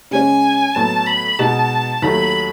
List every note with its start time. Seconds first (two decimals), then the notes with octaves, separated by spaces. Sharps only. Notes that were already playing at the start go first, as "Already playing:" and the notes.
0.11 C#3 G#3 C#4 G#5
0.75 A2 F#3 B3 A5
1.07 B5
1.39 B2 G#3 D#4 F#4 A5
2.02 D#2 D#3 F#3 A3 B5